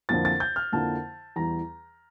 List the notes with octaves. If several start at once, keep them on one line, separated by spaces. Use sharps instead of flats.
F2 D3 F3 A#3 E4 A6
A6
G6
F6
F2 D3 F3 A#3 E4 A5
E2 E3 G3 A#5